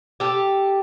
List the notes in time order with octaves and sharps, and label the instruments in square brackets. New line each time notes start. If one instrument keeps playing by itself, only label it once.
[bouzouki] G4 A4